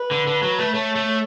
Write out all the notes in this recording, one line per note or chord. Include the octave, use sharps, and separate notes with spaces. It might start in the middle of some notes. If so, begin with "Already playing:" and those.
Already playing: B4
D3
D3
F#3
A3
A3 C#5
A3